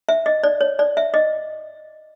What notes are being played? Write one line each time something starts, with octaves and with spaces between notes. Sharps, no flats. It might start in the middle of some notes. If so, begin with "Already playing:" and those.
E5
D#5
D5
C#5
D5
E5
D#5